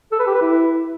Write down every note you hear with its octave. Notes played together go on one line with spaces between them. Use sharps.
A4
B4
G4
B4
E4